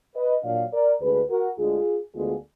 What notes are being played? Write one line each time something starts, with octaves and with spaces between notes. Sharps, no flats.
B4 D#5
A#2 F#3 D4 D5 F5
A#4 D5
D2 D3 G#3 D4 G#4 B4
F#4 A#4
D2 D3 G#3 D4 F4 G#4
D2 D3 G#3 B3 D4 F4 G#4